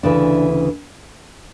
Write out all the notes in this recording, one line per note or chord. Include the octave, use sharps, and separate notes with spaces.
D2 C#3 E3 D4